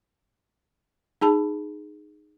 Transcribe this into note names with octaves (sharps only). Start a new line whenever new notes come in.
D#4 G#4 A5 B5